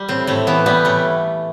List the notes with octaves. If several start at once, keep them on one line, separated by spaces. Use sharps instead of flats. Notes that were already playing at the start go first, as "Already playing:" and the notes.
Already playing: G3
A2 C4
A2 A3
E3 B3
G3 B3
A2 A3